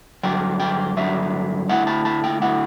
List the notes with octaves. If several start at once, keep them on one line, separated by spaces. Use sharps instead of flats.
G2 D3 F#3 G5
G5
G2 D3 F#3 E5
D3 A3 E4 F#5
A5
A5
G5
D3 A3 E4 F#5